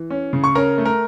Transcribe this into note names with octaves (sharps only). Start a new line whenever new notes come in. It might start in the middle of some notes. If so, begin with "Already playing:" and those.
Already playing: E3
C#4
C#3
C#6
C#4 A#4 A#5
A3
A#4 A#5